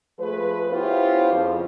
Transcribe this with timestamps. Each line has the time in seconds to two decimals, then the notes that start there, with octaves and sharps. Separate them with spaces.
0.19 F3 A3 G#4 B4
0.69 B3 C#4 E4 F4 G4 C5
1.32 F2 C#3 F3